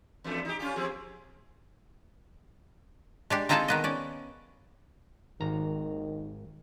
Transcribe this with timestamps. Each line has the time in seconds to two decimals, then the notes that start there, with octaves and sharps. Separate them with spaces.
0.24 E2 G2 A3
0.45 D#4 G4
0.59 C#4 F4 G4
0.76 F3 C4 G#4
3.30 G#3 D4 G4
3.49 C4 D#4 F4 G#4 A4 A5
3.68 D#3 B3 D#5
3.84 C#4 D5
5.40 G#1 D#3 A#5